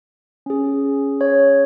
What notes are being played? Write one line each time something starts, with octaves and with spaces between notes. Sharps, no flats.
C#4 G#4
C#5